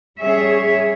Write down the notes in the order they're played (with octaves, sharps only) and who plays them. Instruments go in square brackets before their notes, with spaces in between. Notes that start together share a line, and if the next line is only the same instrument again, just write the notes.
[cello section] G3 C#4 G#4 C#5 E5